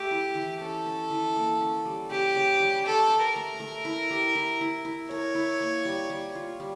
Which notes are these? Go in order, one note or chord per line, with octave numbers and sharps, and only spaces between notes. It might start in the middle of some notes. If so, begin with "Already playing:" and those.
Already playing: A3 G4
E4
E3
C#4 A4
C#4
E3
A#3
C#4
G3
C#3 G4
C#3
G3
A4 C#5
G4
A#4
A3
A3
E4
G4
E4
E4
E4
A#4 C#5
E4
A#3
G3
G3
F4
G3